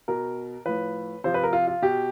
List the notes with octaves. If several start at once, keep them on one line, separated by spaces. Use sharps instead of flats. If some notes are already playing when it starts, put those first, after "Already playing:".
B2 A#4
A2 F3 B4
C3 F3 C5
B4
A#4
F4
F4
B2 G4